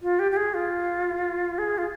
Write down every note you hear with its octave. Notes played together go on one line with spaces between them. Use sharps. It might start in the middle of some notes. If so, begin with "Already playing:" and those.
F4
G4
G4
G#4
F4
G#4
F4